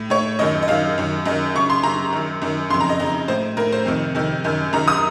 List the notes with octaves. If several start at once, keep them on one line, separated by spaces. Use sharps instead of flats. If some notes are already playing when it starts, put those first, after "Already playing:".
Already playing: A2
A2 C#5
F#2 D#3 D#5
D#5
F#2 D#3 F5
F#2 D#3
F#2 D#3 D#5
F#2 C#3 C#6
C6
F#2 C#3 A#5
F#2 D#3
F#2 D#3
F2 C#3 C6
A#5
D#5
F2 C#3 D#5
A2 C5
A2 A#4
C5
F2 C3 D#3
F2 C3 D#3
F#2 D#3
F#2 D#3 A#5
D#6